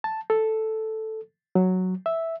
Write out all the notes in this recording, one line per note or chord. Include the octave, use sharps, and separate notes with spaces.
A5
A4
F#3
E5